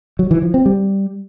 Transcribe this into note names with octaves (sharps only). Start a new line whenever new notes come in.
F#3
E3
F3
C4
G3